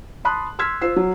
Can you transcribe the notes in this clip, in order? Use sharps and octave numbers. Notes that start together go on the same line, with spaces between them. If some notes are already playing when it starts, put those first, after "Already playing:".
A5 B5 C6 D#6 F#6
C6 E6 F6 G#6 B6
F4 C5 E6 C7
F#3